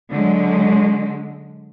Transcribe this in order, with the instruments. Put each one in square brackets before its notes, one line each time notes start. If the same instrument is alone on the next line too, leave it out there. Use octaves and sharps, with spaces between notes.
[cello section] D3 F#3 G#3